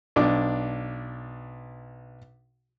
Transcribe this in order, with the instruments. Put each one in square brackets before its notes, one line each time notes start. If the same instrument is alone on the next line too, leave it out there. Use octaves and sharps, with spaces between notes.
[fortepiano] B1 D4 D6